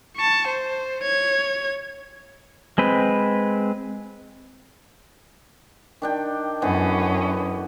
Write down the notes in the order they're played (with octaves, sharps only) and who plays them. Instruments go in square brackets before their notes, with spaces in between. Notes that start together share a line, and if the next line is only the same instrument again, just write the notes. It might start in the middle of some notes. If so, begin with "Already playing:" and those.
[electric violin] A5 C#6
C5
C#5 G#6
[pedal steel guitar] G#3 C4 B4
[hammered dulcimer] D#3 D4 G5
[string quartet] F#2 C#4 [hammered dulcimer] D3 E3 B3